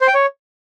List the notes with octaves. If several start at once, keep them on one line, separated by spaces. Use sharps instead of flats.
C5
G5
C#5